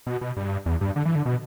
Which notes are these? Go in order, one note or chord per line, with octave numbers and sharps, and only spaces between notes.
B2
B2
G2
E2
G2
D3
E3
D3
B2